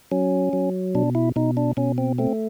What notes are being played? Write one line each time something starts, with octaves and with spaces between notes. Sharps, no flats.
F#3 C#4
F#3
B2 D4
E4
B2 D#4
D4
B2 C#4
C4
A3 C4